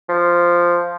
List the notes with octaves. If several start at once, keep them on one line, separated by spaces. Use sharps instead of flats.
F3